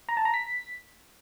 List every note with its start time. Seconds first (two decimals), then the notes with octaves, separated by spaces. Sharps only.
0.09 A#5
0.17 A5
0.25 A#5
0.34 B6